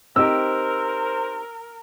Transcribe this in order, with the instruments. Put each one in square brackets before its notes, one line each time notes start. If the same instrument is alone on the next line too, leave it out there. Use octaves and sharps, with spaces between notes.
[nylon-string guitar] C4 D#4 G4 [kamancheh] A#4 [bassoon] C5 [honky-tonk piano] E6